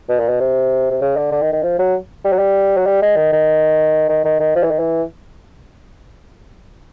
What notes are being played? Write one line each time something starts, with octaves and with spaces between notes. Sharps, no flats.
B2
A#2
B2
C3
C3
C#3
D3
D3
D#3
D#3
F3
F#3
G3
F#3
G3
F#3
G3
G#3
D#3
D#3
D#3
D#3
D#3
F3
E3
D#3
E3